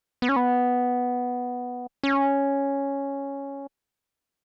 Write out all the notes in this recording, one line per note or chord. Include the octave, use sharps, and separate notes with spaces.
B3
C#4
B3
C#4